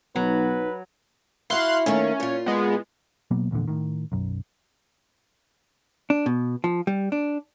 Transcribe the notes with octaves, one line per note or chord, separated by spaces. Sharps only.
B1 F#3 D#4 B4
E4 F#4 F5 C6 F#6
D#3 A3 A#3 C#4
A#2 F4
G#3 B3
B2 F#3 A#3 B3
A#1 E2 A#2 D3
A2 D#3
B1 F#2
D4
B2
F3
G3
D4